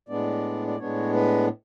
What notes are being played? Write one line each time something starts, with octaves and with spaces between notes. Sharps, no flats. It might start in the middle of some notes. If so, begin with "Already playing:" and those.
A2 G#3 B3 D4 D5
D5
A2 G#3 B3 D4 C#5
B4